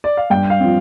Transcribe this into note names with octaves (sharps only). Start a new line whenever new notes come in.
D5
F5
G2 G5
F5
F3 C4